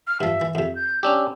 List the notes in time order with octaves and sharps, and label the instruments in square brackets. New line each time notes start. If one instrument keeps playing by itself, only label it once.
[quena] F6
[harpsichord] G2 F3 [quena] E5
[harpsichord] E3
[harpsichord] F2 C3 [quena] E5
[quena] G6
[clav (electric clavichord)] C#4 D4 G4 [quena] E6